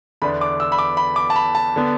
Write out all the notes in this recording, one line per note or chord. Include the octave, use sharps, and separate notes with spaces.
E2 D3 B3 D4 B5
D6
E6
B5
D6
B5
D6
A5
B5
A5
D3 B3